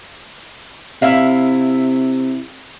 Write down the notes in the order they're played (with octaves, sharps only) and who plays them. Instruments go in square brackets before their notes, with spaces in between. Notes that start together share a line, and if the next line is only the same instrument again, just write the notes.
[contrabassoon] C3 [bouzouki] E4 E5 F5